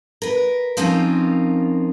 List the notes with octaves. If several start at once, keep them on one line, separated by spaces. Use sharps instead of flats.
A#4 B4
F3 C4 C#4 D#4 F4 A#4